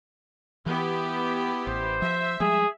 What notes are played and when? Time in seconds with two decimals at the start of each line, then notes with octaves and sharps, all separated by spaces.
0.66 E3 B3 E4 G4
1.67 A1 C5
2.02 F3 E5
2.40 F3 G3 G#3 G#4